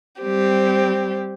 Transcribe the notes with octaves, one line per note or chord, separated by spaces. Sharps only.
G3 C4 G4